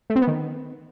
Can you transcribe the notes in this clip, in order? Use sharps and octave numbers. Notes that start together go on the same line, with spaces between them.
A3
C4
B3
D#3